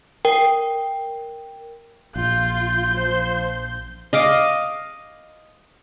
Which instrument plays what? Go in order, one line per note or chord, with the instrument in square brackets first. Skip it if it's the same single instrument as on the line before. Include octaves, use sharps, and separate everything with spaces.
[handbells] A#4 G5
[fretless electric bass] A#1 [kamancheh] F4 [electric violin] G6
[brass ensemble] F3 [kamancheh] C5
[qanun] D#5 F5 D6